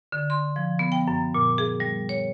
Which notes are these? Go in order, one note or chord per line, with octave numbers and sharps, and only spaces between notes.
D3
C6
F3
B3
G5
F#2
A#2
G#4
G3
C#5